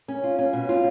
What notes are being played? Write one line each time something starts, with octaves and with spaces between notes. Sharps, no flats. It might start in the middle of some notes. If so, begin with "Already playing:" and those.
C#4
F4
C#4
B2
F4